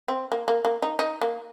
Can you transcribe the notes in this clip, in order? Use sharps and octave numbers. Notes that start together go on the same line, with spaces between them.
C4
A#3
A#3
A#3
D#4
D#4
A#3